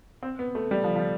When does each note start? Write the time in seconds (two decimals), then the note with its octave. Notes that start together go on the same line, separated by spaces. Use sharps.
0.23 C4
0.39 B3
0.55 A3
0.71 G3
0.84 F3
0.96 F3